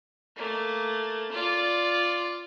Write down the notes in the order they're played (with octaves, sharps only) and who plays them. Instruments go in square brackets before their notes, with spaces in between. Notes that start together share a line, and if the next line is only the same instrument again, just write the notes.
[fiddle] A3 A#3
F4 D5